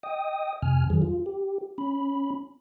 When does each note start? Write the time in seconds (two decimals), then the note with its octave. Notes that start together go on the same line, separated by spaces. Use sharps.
0.03 D#5 G5 D#6
0.62 F2 C3 G#5 F6
0.90 F2 D#3 F#3 G#4
1.02 F4
1.26 G4
1.78 C#4 B5